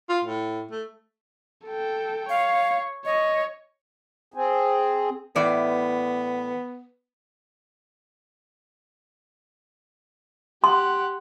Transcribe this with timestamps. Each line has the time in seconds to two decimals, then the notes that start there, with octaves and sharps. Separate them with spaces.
0.09 F4
0.24 A2
0.71 A3
1.66 A4 G5
2.29 C#5 F5
3.05 C#5 D#5
4.34 C4 G#4
5.36 A2 E3 B3 D5
10.64 G4 F#5 C6